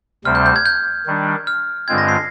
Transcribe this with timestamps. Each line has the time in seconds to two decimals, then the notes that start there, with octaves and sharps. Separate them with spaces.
0.25 D2 C3 G3 C4 F6
0.35 G6
0.46 G6
0.56 G#6
0.66 G6
1.06 D#3 G3 D4
1.47 F6
1.88 G2 D3 G#3 C4 F4 G#6
1.98 A#6
2.08 C7